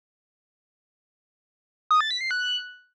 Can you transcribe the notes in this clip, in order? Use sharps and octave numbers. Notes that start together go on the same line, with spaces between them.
D#6
A6
B6
C7
F#6